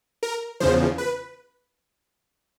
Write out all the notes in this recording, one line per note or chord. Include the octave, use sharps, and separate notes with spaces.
A#4
E2 C#3 F3 C5
B4